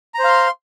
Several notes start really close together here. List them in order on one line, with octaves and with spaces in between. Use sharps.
A#5 C5 F5 C6